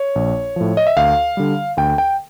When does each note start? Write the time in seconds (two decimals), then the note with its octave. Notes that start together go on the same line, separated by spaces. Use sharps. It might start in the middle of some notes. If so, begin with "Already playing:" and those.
Already playing: C#5
0.15 A#1
0.56 A2 F3
0.77 D#5
0.87 E5
0.97 D2 F5
1.37 D3 G3
1.77 D2 G5
1.98 G5